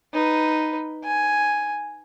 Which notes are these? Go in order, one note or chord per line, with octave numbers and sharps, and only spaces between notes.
D#4 B4
G#5